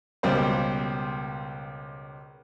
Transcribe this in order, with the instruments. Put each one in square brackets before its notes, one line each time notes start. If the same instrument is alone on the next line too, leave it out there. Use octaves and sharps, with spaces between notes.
[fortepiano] C#2 B2 G3 A#3 C5